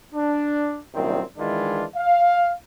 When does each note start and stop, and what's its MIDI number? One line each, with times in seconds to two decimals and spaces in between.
0.15 0.79 62
0.94 1.21 36
0.94 1.21 42
0.94 1.21 46
0.94 1.21 51
0.94 1.21 60
1.38 1.84 51
1.38 1.84 52
1.38 1.84 56
1.38 1.84 62
1.38 1.84 64
1.38 1.84 65
1.96 2.52 77